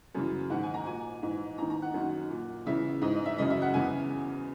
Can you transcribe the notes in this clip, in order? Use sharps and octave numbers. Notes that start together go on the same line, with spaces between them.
F#2 C#3 E3
G#2 D#3 F#5
G#5
A#5
A#2 G#5
G#2 E3
E2 D#3 A#5
A#5
F#5
F#2 D#3
A#2
E2 C#3 E3 E5
G#2 E3 D#5
D#5
E5
F#2 C#3 E3 D#5
E5
F#5
E2 C#3 E3 G#5